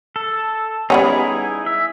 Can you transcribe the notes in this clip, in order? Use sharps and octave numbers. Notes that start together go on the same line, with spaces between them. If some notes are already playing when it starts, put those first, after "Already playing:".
A4
G3 B3 C#4 D#4 E4 G#4
E5